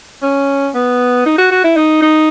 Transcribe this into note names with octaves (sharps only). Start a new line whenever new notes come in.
C#4
B3
D#4
F#4
F#4
E4
D#4
D#4